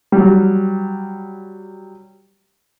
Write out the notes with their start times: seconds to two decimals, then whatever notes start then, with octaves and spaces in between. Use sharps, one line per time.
0.12 F#3 G3